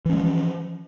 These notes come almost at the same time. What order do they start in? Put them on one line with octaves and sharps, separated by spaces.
E3 C#4 G#3 F3